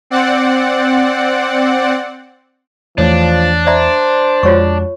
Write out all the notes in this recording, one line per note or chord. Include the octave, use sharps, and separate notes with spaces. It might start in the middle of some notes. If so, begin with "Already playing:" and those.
C4 D5 F#5
E2 E3 F3 A3 D4 C#5
C5 D5 E5 A#5
F2 G#3 F4 F#4 C#5 C#6